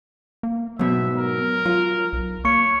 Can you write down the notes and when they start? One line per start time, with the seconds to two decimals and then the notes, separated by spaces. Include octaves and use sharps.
0.43 A#3
0.79 G#2 B2 F#3 E5
1.18 A#4
1.66 F#3 F4
2.13 B1
2.45 A#3 C#5 C#6 C#7